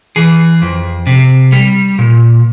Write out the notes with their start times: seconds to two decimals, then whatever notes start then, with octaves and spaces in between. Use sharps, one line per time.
0.16 E3 G#4
0.62 F2
1.07 C3
1.52 G3
1.99 A#2